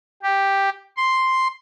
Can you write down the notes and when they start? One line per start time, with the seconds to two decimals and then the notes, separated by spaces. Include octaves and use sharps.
0.23 G4
0.97 C6